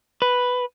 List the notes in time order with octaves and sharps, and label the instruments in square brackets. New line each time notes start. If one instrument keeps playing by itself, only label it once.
[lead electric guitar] B4